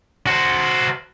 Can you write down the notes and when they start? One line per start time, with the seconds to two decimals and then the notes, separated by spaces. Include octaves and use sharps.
0.27 F#4 C5